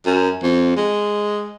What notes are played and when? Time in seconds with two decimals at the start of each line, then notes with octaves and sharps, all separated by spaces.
0.06 F#2
0.43 F2
0.77 G#3